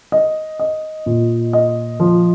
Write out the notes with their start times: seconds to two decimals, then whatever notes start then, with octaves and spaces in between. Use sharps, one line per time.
0.12 D#5
0.59 D#5
1.06 A#2
1.53 D#5
2.00 F3